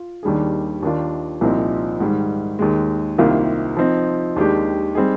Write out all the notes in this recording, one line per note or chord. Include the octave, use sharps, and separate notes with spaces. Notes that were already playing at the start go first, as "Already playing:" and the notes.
Already playing: F4
D#2 D#3 G3 D4 G#4
D#2 D#3 A#3 D4 F4
C2 A#2 F3 C4 D#4
G#2 D#3 G3
D#2 D#3 G#3
C2 C3 D#3 A#3 F4
F3 C4 D#4
D#2 D#3 G#3 D4 G4
G3 C4 D#4 G#4